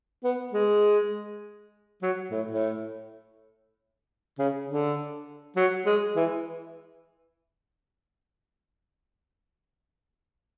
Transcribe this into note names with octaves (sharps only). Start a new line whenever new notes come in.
B3
G#3
F#3
A2
A2
C#3
D3
F#3
G#3
E3